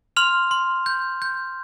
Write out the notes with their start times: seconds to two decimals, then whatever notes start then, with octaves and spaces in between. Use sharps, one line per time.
0.16 C6 F6 F7
0.51 C6
0.86 G6
1.22 G6